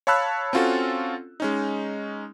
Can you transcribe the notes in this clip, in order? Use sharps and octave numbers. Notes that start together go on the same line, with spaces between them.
C#5 F5 A5 B5 E6 F#6
C4 C#4 F4 F#4 A4
G#3 C#4 D#4